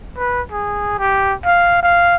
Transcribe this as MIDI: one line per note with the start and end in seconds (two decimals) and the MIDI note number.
0.18 0.41 71
0.52 0.95 68
0.99 1.33 67
1.45 1.80 77
1.83 2.16 77